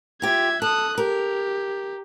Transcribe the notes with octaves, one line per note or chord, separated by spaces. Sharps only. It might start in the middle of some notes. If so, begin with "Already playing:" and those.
F4 G4 E5 G#6
A4 D#6 F#6
G4 A#4